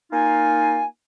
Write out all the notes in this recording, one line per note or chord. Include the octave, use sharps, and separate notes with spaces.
A#3 D#4 F4 G#5